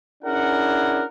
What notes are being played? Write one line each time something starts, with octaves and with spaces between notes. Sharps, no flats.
C#4 D4 E4 G#4 A#4 F#5